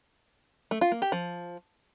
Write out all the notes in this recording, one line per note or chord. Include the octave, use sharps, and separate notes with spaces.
A3
F4
A#3
G4
F3